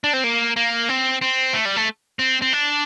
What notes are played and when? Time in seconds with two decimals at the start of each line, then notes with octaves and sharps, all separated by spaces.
0.04 D4
0.13 C4
0.24 A#3
0.57 A#3
0.89 C4
1.21 C4
1.54 A3
1.65 G3
1.77 A3
2.19 C4
2.42 C4
2.53 D4